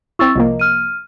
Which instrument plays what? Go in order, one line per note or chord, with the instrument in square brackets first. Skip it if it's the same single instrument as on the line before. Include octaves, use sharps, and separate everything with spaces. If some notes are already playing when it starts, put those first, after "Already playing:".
[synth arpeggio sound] C4 E4 [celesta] C#6 E6 A6
[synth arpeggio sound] C2 F3 A#3 [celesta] D#5
[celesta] F6 D#7